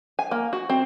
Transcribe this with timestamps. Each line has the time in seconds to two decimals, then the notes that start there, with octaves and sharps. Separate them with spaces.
0.19 G#5
0.31 A#3
0.53 F#4
0.70 C4